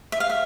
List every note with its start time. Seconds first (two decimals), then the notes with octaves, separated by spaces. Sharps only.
0.12 E5
0.20 F5
0.30 E5